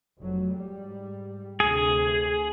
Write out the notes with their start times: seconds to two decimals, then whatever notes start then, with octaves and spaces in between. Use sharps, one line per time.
0.18 F1 F#3
0.52 G#2 G3
1.60 D2 C3 G#4